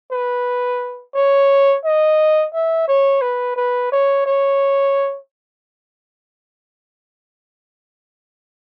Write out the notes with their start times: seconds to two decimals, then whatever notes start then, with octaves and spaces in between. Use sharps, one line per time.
0.11 B4
1.15 C#5
1.85 D#5
2.53 E5
2.88 C#5
3.22 B4
3.56 B4
3.92 C#5
4.26 C#5